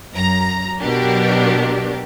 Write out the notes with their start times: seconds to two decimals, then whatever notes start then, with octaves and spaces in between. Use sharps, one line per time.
0.13 F#2 A#5
0.80 B2 F#3 D4 G4 A#4